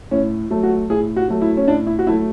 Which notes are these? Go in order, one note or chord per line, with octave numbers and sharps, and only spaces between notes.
A2 C#4
F#3 A3
F#4
A2 G#4
F#4
F#3 A3
E4
C#4
A2 D4
E4
F#4
F#3 A3 E4